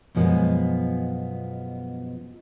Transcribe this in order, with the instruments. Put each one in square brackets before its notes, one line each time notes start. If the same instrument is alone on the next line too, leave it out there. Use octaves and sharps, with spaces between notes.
[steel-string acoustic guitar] F#2 B2 F3 G#3 B3